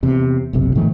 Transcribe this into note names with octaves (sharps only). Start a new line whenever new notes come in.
E2 C3
F#1 B1 C3
G#2 D#3 F3 A3